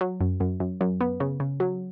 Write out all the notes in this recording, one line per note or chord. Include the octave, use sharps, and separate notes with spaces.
F#3
F#2
F#2
F#2
F#2
B3
C#3
C#3
F#3